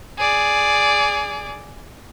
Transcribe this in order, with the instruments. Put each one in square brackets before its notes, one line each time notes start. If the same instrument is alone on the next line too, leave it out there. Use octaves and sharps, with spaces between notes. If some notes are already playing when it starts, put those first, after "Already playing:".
[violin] G#4 D5